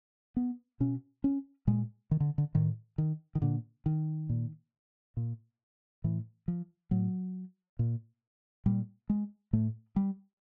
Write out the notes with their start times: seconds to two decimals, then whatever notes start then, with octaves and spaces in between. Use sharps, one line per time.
0.37 B3
0.80 B2 C#4
1.24 C#4
1.67 A#2 G#3
2.11 D#3
2.20 D3
2.38 D3
2.55 A2 D#3
2.98 D#3
3.35 D#3
3.42 A#2 D3
3.86 D#3
4.29 A#2
5.17 A#2
6.04 A2 E3
6.48 F3
6.91 A2 F#3
7.79 A#2
8.66 A#2 G3
9.10 G#3
9.53 A2 A3
9.96 G3